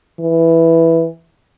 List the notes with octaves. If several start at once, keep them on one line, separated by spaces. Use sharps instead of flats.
E3